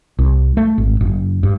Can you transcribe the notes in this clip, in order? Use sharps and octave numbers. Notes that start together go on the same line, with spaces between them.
C2
A3
G#1
F#1
G2